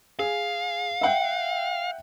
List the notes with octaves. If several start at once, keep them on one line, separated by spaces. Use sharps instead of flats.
G#4 F5
E5 F#5 G5